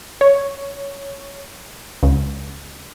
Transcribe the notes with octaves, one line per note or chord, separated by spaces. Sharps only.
C#5
C#2